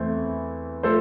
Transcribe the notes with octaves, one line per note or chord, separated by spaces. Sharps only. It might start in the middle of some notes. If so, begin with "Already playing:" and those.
Already playing: E2 E3 A3 C4
F3 A3 A4 C5